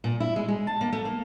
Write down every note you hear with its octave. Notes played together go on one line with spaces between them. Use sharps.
A#2
E4
G#3
G#3
A5
A#3
A3
A#3